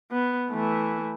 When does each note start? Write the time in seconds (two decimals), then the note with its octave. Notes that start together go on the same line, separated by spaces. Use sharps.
0.12 B3
0.50 E3 A3